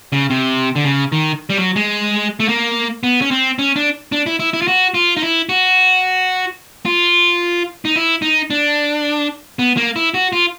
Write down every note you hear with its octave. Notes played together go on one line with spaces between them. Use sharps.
C#3
C3
D3
C#3
D#3
G3
F#3
G#3
A3
A#3
B3
C#4
C4
C#4
D4
D4
E4
E4
E4
F4
F#4
F4
D#4
E4
F#4
F4
D#4
E4
D#4
D4
B3
A#3
E4
F#4
F4